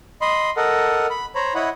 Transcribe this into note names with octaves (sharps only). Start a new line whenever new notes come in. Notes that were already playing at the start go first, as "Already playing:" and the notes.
D#5 B5 C6
A4 A#4 D#5 F#5
B5
C5 C#5 A#5 B5
E4 C#5 D#5 F#5 B5